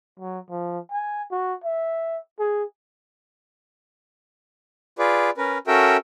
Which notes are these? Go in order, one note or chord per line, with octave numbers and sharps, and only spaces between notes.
F#3
F3
G#5
F#4
E5
G#4
F4 G#4 B4 D5
C#4 A#4 B4
C#4 F#4 A4 A#4 E5 G5